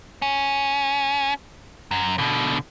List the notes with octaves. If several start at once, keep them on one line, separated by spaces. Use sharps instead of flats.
C#4
F#2
B2 D3